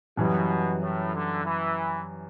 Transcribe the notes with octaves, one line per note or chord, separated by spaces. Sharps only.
F#2 B2 E3 G3
A2
D3
E3